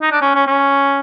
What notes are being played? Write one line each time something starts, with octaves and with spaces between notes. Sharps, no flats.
D#4
D4
C#4
C#4
C#4